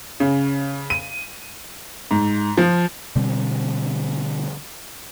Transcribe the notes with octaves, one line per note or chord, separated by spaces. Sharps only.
C#3
D#7
G#2
F3
B2 D3 G3 C4